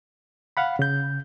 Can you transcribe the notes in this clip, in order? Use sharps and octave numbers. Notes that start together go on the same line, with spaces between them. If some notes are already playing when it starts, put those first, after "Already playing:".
F5 F#5 B5
C#3 G6